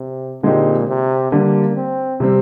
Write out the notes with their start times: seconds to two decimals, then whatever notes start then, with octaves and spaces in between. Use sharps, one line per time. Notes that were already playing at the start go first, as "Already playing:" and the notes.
Already playing: C3
0.43 A#2 D3 G#3 C4 D#4 G4
0.88 C3
1.32 D3 G3 A#3 D4
1.76 C4
2.20 C3 G3 C4